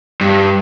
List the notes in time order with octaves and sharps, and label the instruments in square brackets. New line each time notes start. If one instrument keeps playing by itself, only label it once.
[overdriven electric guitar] G2